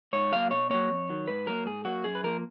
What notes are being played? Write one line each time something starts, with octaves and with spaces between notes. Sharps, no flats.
G#2 C#5
F#3 A#3 F5
B2 C#5
F#3 A#3 C#5
F2
D#3 F#3
G#2 B4
F#3 A#3 A#4
G#2 G#4
F#3 A#3 F#4
F#2 G#4
B4
F3 A#3 A#4